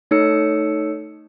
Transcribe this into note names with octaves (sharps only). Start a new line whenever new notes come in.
A3 D#4 A4 C#5 E6 C#7